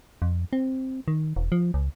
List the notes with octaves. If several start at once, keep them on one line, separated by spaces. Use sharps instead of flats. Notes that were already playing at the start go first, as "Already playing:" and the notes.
F2
C4
D#3
E1
F3
C#2